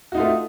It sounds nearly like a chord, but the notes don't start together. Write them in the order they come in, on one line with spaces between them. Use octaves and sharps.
F#4 D#4 F4 A3